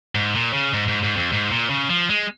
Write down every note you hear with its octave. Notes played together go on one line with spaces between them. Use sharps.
G#2
A#2
C#3
G#2
G#2
G#2
F2
G#2
A#2
C#3
F3
G#3